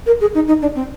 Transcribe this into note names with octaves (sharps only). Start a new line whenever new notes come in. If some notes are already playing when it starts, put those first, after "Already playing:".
A#4
G#4
D#4
D#4
D4
C4